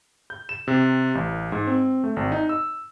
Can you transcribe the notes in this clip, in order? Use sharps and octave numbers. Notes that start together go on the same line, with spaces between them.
G6
E7
C3
A1
G#2
C4
A3
G#1
D#4
E6